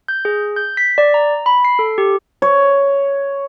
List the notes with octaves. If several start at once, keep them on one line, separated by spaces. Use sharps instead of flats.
G6
G#4
G6
B6
D5
A#5
B5
C7
A4
G4
C#5